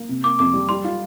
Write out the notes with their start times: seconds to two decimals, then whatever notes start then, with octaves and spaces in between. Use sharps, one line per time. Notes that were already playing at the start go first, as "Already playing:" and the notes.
Already playing: A#3
0.09 C3
0.24 A#3 D6
0.39 F2 D6
0.54 G3
0.69 G3 C6
0.84 F4